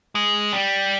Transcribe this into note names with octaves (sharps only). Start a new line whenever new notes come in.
G#3
G3